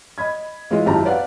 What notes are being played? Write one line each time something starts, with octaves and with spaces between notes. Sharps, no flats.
D#5 B5 G#6
E3 G#3 E4 F4 D#5
G#1 F#2 E4 G4 A5 A#5
B4 D5 F5 F#5